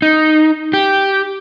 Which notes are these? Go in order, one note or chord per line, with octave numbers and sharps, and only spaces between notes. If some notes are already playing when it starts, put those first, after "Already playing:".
D#4
G4